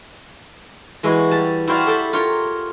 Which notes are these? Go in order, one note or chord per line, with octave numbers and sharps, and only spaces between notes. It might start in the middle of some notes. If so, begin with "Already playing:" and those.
E3 G#3 E4 F#4
G3 A5
E4 F#4 G4 C5 D5 F5
A4 G5 A5 B5
F4 G4 A#4 C#5